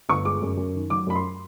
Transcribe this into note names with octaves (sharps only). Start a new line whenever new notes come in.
G1 C#6
G#3 D6
F#2
F#2
D#3
F#3 D6
F#2 B5
C6